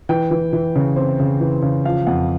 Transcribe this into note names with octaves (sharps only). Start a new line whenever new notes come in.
E3 G5
E3
E3
C#3
C4
C#3
E3
C#3
F3 F5
F2 F#5